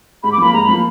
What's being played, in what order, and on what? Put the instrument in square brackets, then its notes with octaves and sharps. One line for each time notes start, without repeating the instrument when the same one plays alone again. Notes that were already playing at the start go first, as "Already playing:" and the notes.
[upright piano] G#2 [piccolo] B5
[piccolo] D6
[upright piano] F3 A#3 [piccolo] B5
[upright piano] G#2 [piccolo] A#5
[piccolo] B5
[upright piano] F3 A#3